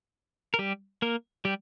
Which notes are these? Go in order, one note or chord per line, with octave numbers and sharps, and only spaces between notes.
A#4
G3 G4
A#3 A#4
G3 G4